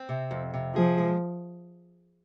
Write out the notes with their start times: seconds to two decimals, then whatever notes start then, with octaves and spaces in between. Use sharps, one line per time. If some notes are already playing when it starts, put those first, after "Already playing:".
Already playing: C4
0.09 C3
0.31 F2
0.54 C3
0.75 F3 G#4
0.98 G#3